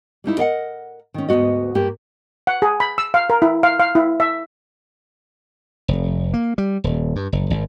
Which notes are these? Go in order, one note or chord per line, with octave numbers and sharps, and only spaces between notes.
G3 A#3 D#4 E4
A#4 D#5 F5 F#5
D#3 C#4
D2 G#2 B3 F#4 D#5
G2 A#3 G4
F#5
G#4
B5
E6
F5
A#4
E4
F5
F5
E4
E5
F1
A#3
G3
D#1
G2
F#1
G#1